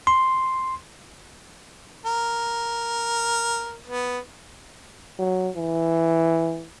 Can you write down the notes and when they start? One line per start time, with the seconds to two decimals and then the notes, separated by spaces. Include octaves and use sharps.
0.07 C6
2.05 A#4
3.87 B3
5.19 F#3
5.56 E3